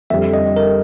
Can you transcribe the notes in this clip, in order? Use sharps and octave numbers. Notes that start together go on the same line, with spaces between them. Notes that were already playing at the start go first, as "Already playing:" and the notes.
F2 D3 G3 E5
D#5
A#4